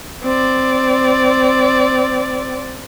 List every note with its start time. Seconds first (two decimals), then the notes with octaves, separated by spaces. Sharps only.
0.23 C4 D5